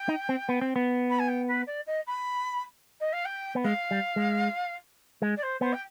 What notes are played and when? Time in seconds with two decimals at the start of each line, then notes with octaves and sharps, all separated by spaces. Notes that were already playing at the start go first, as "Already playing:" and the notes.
Already playing: G5
0.08 D#4
0.29 C4
0.49 B3
0.61 C4
0.76 B3
1.09 B5
1.19 G#5
1.28 G5
1.47 B4
1.66 D5
1.86 D#5
2.06 B5
3.00 D#5
3.12 F5
3.25 G5
3.55 B3
3.64 G#3 F5
3.91 G3
4.16 G#3
5.22 G#3
5.36 D5
5.42 C5
5.61 B3 C5
5.73 G5